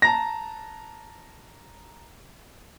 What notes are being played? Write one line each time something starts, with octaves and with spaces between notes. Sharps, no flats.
A5 A#5 A#6